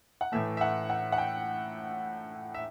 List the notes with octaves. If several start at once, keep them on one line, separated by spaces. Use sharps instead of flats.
F#5
A2 E3 A3 E5
E5
F#5
F#5
F#5
G5
E5